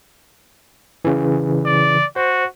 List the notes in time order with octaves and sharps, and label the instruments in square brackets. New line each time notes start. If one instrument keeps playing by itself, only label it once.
[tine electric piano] C#3 E3
[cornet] D5
[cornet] F#4 [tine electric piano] C5